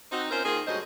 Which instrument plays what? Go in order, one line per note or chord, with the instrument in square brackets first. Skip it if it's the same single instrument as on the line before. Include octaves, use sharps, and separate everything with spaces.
[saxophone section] C4 D#4 F#4
C4 C#4 F4 A#4 C5
D#3 A#3 F4 G#4
D2 G2 F#3 G#3 C5 D#5